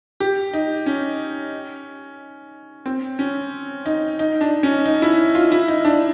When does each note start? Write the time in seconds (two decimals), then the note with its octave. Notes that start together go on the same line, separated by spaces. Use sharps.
0.20 G4
0.53 D#4
0.86 C#4
2.86 C4
3.19 C#4
3.86 D#4
4.19 D#4
4.41 D4
4.63 C#4
4.86 D#4
5.02 E4
5.35 F4
5.52 E4
5.68 D#4
5.85 D4